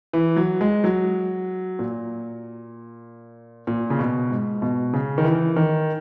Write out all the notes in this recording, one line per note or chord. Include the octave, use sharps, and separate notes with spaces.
E3
F#3
G#3
F#3
A#2
A#2
C#3
B2
G#2
B2
C#3
D#3
E3
D#3